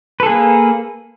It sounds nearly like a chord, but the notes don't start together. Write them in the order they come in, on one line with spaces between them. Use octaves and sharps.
B4 A4 G#4 A#3